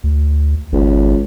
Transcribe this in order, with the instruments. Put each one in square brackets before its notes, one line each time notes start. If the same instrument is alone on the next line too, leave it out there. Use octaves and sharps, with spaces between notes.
[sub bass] D2
[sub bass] G#1 [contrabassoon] C#2
[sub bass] G#1